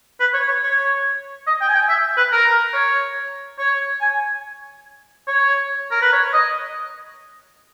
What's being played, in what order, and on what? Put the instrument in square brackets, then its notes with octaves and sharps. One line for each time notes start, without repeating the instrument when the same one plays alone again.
[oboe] B4
C#5
C#5
C#5
D#5
G5
G#5
G5
E5
B4
A#4
C#5
C#5
G#5
C#5
A#4
B4
C#5
D#5